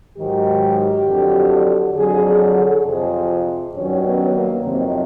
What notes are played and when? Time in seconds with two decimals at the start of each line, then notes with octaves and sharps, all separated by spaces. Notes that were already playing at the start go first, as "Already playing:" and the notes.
0.17 G#2 D#3 F#3 G4
1.06 F2 D3 F#3
1.96 F2 D3 F#3 G#4
2.26 G#4
2.55 A4
2.85 F2 C3 F3 G#4
3.75 G2 D#3 F#3 C#4
4.04 B3
4.35 A#3
4.64 F2 C3 D#3 F#3 C4